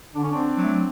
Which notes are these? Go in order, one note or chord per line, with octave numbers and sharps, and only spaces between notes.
D3 D4
C#4
C4 D4
F#3 A3